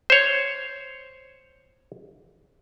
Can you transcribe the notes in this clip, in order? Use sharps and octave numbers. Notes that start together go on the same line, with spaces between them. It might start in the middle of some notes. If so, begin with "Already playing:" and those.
C5 C#5